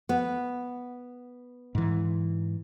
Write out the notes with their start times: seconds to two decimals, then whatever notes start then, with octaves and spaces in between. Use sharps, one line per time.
0.09 B3
1.75 G#2 E3